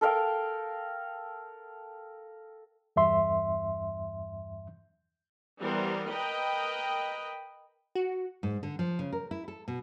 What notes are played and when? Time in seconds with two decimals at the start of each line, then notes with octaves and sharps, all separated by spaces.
0.01 A4 A#4 F5 G5
2.96 E2 G2 E5 C6
5.60 E3 G3 B3 A#4 C5
6.11 A#4 B4 D#5 G5 B5
7.95 F#4
8.43 G#2
8.63 D3
8.79 F3
8.99 C#3
9.12 A#4
9.31 E4
9.48 A4
9.68 B2